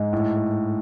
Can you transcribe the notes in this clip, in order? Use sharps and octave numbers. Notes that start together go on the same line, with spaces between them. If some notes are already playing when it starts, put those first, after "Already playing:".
Already playing: G#2
A2